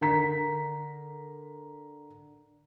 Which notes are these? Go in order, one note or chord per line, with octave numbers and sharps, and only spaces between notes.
D3 A#4 A#5 B6